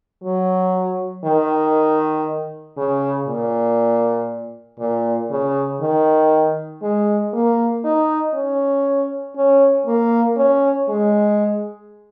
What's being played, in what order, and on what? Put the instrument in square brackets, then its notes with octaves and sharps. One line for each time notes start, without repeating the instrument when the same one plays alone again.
[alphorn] F#3
D#3
C#3
A#2
A#2
C#3
D#3
G#3
A#3
D#4
C#4
C#4
A#3
C#4
G#3